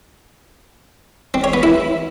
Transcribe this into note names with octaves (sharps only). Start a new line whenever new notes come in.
C4
C#5
B3
E4